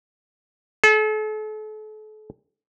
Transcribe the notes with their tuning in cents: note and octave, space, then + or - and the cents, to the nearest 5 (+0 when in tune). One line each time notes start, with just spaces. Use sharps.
A4 -40